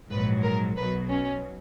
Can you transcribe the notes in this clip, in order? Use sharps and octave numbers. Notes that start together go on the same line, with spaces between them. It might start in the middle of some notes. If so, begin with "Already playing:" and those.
A#1 G#2 F#3 B4
A#4
B1 B2 F#3 B4
C#4